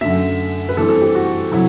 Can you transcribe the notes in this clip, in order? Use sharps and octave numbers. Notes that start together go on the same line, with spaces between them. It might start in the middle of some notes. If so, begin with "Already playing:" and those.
F#2 D3 A3 E5
B4
G2 E3 A3 C4 A4
A4
G4
F#4
C3 F#3 E4